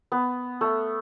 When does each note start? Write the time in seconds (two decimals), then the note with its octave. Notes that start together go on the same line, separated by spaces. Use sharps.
0.12 B3
0.61 A3